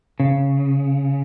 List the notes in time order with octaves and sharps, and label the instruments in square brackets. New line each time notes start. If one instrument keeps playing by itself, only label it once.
[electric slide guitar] C#3